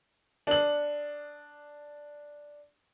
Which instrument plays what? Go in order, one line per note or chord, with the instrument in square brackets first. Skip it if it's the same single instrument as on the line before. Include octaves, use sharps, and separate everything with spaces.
[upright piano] D4 F#7